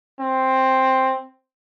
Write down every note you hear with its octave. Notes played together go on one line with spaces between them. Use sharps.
C4